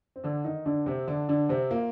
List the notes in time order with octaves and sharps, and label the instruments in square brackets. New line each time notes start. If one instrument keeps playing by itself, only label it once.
[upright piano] C4
D3 D4
D#3 D#4
D3 D4
C3 C4
D3 D4
D3 D4
C3 C4
A#2 A#3